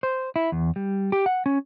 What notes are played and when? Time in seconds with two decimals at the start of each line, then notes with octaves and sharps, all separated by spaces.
0.03 C5
0.36 E4
0.52 E2
0.76 G3
1.12 G4
1.26 F#5
1.46 C#4